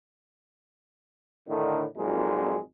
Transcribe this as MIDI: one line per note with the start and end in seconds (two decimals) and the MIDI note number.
1.49 1.84 45
1.49 1.84 50
1.49 1.84 51
1.97 2.58 32
1.97 2.58 41
1.97 2.58 46
1.97 2.58 54
1.97 2.58 56
1.97 2.58 63